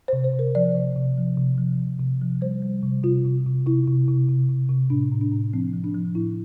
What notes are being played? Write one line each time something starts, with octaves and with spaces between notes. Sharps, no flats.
C3 C5
C5
C3
A#4
F3 D5
C3
C3
F3
C3
F3
F3
C3
F3
G3 C5
G3
C3
C3 F4
C3
C3
C3 E4
C3
C3
C3
C3
C3
A2 D4
A2
D4
A2
F3 C4
F3
D4
F3
A2 E4